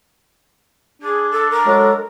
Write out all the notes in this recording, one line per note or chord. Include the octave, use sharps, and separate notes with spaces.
D4 G#4
A4
A#4
F#3 G#3 A4